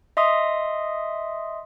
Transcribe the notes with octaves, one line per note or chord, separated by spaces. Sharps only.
D#5 E5 C6 D#6